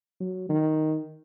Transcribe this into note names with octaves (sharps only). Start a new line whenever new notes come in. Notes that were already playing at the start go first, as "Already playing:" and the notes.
F#3
D#3